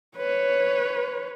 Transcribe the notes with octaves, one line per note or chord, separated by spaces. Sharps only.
B4 C#5